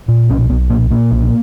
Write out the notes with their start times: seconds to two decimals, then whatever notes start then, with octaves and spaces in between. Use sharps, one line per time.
0.08 A#2
0.30 B1 C#4
0.50 B1 B3
0.70 A#2 A#3
0.91 A#2 A#3
1.11 B1